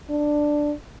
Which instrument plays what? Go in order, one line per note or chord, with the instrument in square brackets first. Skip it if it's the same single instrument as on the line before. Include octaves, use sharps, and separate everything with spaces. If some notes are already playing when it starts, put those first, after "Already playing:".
[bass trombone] D4